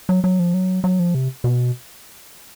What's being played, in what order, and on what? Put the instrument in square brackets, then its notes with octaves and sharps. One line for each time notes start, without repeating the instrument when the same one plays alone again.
[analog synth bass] F#3
F#3
F3
F#3
F#3
F3
C3
B2